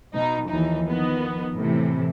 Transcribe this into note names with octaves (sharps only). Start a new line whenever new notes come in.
B2 D#4
D#2 E3 F3 D#4
D#3 F3 B3
A2 C3 E3